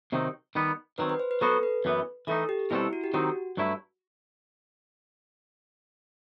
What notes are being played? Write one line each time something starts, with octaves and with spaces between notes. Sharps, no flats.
C3 D#3 F#3 C4 D#4
D#3 G3 B3
D#3 F#3 C4 B4
B4
C5
B4
F#3 B3 F#4 A4 C5
B4
F#2 E3 B3
E3 A3 D#4 A4
G4
B2 G3 C4 E4 F#4 A4
E4
F#4
G4
D#3 F#3 C4 D#4 F#4
G2 F#3 A3 E4